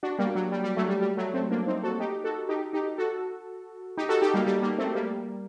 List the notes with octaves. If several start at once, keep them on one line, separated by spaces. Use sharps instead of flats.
D4 F#4
G3 A#3
F#3
G3
G3
F#3 A3
G3
G3
F#3 A3
A3 C4
A#3 D4
C4 D#4
F#4 A4
D#4 G4
F#4 A4
D#4 G4
D#4 G4
F#4 A4
D#4 G4
F#4 A4
D#4 G4
G3 A#3
G3
G3 A#3
A3 C4
G3 A#3